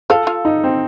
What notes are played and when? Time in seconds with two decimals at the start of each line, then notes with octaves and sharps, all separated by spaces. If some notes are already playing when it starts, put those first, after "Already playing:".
0.10 F4 A4 F5
0.27 F4 F5
0.45 D#4
0.64 C4